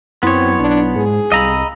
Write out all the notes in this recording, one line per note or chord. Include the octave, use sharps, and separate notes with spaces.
F#2 B3 C4 E4 C#5 C6 D#6
B1 D4
G#2 G#4
C2 D#5 F5 A#5 B5 E6 D#7